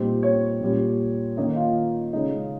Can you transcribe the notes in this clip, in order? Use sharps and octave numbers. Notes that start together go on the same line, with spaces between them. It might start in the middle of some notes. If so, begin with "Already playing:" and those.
Already playing: A#2 G3 C4 D#4
C#5
A#2 G3 C#4
D#3 A#3 C#4 D#4 D#5
F4 F5
C#3 G#3 D#4